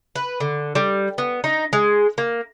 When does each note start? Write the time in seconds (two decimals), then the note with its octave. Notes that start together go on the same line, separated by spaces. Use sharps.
0.16 B4
0.40 D3
0.75 G3
1.18 B3
1.44 D#4
1.73 G#3
2.18 A#3